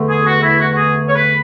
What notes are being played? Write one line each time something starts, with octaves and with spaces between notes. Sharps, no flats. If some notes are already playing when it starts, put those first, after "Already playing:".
Already playing: E2 D3 A3
G#4
F#4
E4
F#4
F#4
G#4
C#5
B4